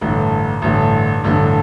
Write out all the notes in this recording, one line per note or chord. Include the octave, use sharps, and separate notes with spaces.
A1 G2 D3
A1 G2 D3
A1 G2 D3